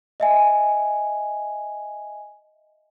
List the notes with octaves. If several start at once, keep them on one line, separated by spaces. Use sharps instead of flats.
D#5 E5 G#5